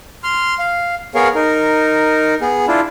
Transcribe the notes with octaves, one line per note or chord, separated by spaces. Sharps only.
C6 F6
F5
B3 G#4 A#4 C#5 F5
D#4 A#4
B3 G#4
D4 E4 F4